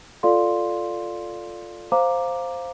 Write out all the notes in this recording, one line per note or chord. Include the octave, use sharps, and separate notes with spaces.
F4 A4 D5 F5 C6
C5 F5 A#5 D6